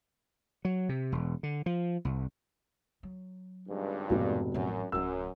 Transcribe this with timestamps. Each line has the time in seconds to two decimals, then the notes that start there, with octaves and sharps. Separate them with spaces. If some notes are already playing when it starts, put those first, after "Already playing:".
0.65 F#3
0.89 C3
1.12 E1
1.43 D3
1.66 F3
2.05 C2
3.03 F#3
3.67 G#1 C#2 G2
4.10 F1 G#2 B2 A3
4.54 A1 F#2 F#3
4.92 D1 F#2 F#3 E6